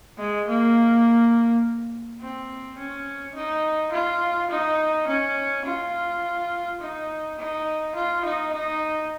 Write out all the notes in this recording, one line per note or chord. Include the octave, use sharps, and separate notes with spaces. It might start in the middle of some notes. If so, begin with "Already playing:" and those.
G#3
A#3
C4
C#4
D#4
F4
D#4
C#4
F4
D#4
D#4
F4
D#4
D#4